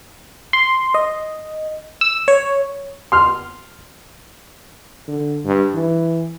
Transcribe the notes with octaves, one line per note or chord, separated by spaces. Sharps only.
C6
D#5
E6
C#5
C6 F6
D3
G2
E3